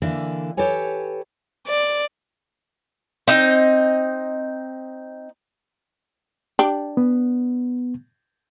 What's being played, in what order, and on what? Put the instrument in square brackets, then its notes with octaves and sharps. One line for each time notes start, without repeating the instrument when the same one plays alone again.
[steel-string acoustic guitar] D3 E3 A#3 D4
G4 A4 B4 C#5 G#5
[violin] D5
[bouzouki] C4 D#4 D#5
[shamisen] D4 G4
[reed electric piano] B3